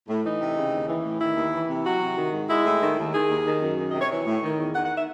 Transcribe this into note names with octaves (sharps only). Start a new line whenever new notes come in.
A2
E3 D#4
C3
C#3
D#2
E3
A2
D#3 E4
D#2
E3
C3
F#3 F#4
C3
D#3
G#2
G#3 E4
A2
D#3
D#2
D#3 G#4
D#2
D#3
F#2
D#3
D#5
C3
C#5
E3 C#5
A2
D#3
E2
D#3 F#5
F#5
E5